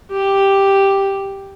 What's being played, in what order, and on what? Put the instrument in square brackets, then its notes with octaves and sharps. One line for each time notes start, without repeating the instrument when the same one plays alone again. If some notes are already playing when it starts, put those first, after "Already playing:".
[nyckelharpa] G4